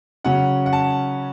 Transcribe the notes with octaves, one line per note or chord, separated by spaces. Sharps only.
C#3 F#3 C#4 F#5
F#5
A5